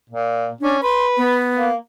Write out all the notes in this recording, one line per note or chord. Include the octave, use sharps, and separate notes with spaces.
A#2
C#4 D4
B4 C6
B3
A#3